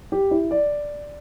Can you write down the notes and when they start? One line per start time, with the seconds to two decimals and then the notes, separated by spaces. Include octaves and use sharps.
0.12 G4
0.31 E4
0.51 D5